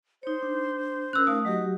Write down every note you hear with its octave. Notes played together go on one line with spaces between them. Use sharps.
D#4 C5 C#5
D4
C#4 A#4 E6 F#6
A3 D#4 F5 D#6
F#3 F#4 G4 D#5